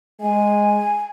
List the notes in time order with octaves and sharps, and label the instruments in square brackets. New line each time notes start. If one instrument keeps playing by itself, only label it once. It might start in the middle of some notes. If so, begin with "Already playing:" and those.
[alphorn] G#3 [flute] G#5